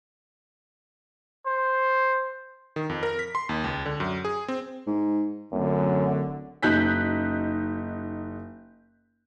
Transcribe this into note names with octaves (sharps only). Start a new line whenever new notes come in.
C5
D#3
F2
A#4
B6
C6
D#2
C#2
D3
F#2
G#4
C4
G#2
D1 F#2 D3
F#1 D#4 F#6 G6 B6